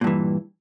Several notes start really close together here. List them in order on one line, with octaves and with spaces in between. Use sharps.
A#2 G2 E3